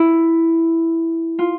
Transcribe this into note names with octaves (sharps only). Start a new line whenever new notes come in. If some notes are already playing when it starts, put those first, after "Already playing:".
Already playing: E4
F4